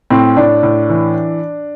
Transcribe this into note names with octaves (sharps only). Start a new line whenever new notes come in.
A2 C4
A2 D4
A2
E3